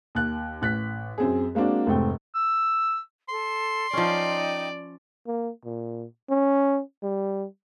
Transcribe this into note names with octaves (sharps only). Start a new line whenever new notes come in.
D#2 F#6
A1 F#6 B6
F#2 C4 G#4
G#3 A#3 C4 D4 F#4
F1 G#2 A3 C4 G5
E6
A4 C6
F3 C#4 D#4 D5 G5
A#3
A#2
C#4
G3